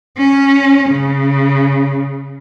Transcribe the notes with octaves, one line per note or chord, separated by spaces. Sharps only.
C#4
C#3